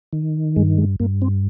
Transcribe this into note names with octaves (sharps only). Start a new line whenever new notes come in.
D#3
G2 G#3
G#3
G2 A#3
C4